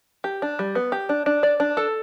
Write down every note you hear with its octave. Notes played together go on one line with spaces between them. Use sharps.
G4
D4
G3
B3
G4
D4
D4
D5
D4
A4